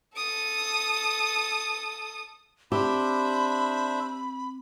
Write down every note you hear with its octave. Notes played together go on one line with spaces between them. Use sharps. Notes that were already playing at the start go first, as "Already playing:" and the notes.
A4 D#6
C4 D4 G4 C5 E5 B5